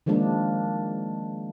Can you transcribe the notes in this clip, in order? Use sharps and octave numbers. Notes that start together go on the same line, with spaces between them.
D#3 F3 G#3 A#3 D4